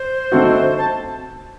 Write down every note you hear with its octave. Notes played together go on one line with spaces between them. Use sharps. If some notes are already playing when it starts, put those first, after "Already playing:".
Already playing: C5
D3 A3 C4 D#4 F#4
A5